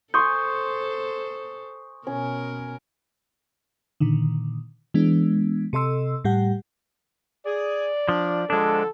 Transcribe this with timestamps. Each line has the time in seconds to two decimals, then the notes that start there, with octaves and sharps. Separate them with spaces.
0.14 A4 C5 G#5 C6 C#6 D#6 G6
2.07 B2 C#4 A#4
4.00 A#2 D3 D#3
4.94 E3 G#3 B3 D4
5.73 C3 A4 D#5 C6 E6
6.24 A2 G3 G4 F#5
7.46 G#4 D5
8.09 F3 D4
8.50 D3 F3 G#3 D4 A4